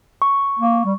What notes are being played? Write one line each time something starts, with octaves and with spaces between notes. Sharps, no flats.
C#6
A#3
G3